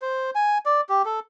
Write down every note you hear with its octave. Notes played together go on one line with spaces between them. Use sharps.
C5
G#5
D5
G4
A4